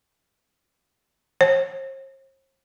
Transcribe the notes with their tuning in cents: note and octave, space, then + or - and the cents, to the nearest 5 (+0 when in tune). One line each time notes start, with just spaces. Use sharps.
C5 +45